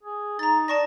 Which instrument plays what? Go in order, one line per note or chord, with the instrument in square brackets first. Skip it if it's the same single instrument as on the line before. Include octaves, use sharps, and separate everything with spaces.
[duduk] G#4
[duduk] D#4 [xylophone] A#5 A6
[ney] D5 [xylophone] A5 C#6 A#6